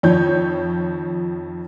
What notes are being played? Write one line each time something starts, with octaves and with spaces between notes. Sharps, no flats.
F2 D#3 F3 C#5 G6